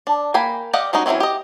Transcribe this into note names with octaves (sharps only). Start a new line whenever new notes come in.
D4
A#3 G5 G#5 B5
G4 D5 D#5 F5 F#5
G3 G#3 C#4 D#4 F#4
E3 F#3 G#3 C4 C#4
G4 D#5